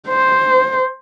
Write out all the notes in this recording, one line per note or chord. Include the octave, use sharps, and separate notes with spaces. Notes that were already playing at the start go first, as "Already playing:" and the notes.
C5